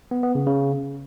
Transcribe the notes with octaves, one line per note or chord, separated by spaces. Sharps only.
B3
B3
C#3
C#3